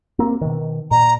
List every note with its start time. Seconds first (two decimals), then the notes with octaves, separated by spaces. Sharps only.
0.19 A#3 C4
0.41 B2 D#3
0.91 A#2 A#5